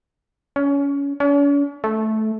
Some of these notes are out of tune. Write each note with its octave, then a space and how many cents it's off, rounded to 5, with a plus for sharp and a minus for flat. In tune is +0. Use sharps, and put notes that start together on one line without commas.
C#4 +25
C#4 +45
A3 -10